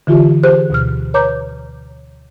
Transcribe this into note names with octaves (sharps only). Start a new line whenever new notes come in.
D3 E3 F4 G4
G4 G#4 C5 F#6
D2 B2 F6
B4 C#5 A#5 D6 G6